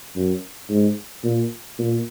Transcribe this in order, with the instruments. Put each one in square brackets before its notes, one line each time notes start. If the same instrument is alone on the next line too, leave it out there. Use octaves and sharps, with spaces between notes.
[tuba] F#2
G#2
A#2
A#2